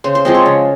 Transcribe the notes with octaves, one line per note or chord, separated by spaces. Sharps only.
C#3 C5
C5
F3 G#3 C4 D#5
C#5
C#3